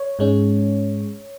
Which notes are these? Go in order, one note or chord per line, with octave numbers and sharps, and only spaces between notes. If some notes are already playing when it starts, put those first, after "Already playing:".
Already playing: C#5
G#2 G#3 C#4